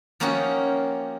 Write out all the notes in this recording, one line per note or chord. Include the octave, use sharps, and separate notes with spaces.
F3 A#3 C#4 D#4 F#4 G4